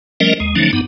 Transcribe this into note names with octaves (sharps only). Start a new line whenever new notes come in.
F3 G3 A3 C#4 A#4 D#5
D#2 G#3
D3 F3 F#3 A3 C#4 D#4
G2 B3 D#4